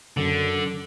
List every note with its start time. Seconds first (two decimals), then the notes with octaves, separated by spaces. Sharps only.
0.17 F#2 D3